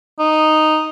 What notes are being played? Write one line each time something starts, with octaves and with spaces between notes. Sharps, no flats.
D#4